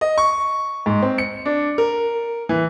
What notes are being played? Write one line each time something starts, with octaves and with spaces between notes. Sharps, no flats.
D#5
C#6
G#2
C4
C#7
D4
A#4
E3